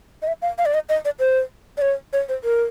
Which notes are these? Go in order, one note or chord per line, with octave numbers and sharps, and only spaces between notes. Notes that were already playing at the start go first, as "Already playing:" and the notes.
D#5
E5
F5
F5
D5
D#5
D#5
D5
C5
D5
C#5
C#5
C5
A#4